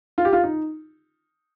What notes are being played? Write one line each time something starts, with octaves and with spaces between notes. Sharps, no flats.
F4
G4
F4
D#4